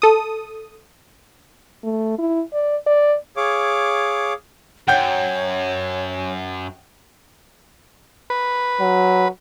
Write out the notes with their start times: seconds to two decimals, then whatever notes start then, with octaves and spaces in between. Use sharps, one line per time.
0.02 A4 D#6
1.83 A3
2.18 E4
2.53 D5
2.86 D5
3.37 G#4 C#5 F5 D6
4.88 F#2 C#5 F#5 G5 G6
8.30 B4
8.81 F#3